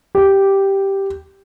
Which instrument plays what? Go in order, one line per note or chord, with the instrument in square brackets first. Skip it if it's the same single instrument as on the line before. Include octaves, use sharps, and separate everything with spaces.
[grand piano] G4